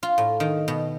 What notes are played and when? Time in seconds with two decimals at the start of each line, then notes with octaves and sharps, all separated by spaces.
0.03 F4
0.18 A2
0.40 D#3
0.68 B2